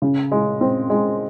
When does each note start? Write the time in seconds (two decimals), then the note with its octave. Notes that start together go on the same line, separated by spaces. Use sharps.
0.02 C#3
0.32 G#3
0.61 C4
0.90 G#3